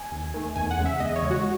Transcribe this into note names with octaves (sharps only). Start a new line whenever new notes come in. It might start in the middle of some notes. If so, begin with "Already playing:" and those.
Already playing: G#5
D#2
D#3 A3
E2 G#5
F#5
C#3 G#3
E5
E2 D#5
C#5
C#3 G#3
F#4